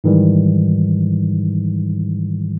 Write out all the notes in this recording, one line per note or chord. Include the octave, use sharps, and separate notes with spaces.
G#2 D#3 E3 G3